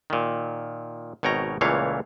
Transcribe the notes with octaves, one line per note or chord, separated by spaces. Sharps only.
A#2 D#3
G#1 B2 C#5 G5 A#5
C#2 A#2 E3 A3 C#5 F5